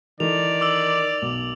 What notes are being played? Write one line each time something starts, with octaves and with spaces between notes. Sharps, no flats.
D#3 E3 A4 D5 F7
D6 E6 F#7
B1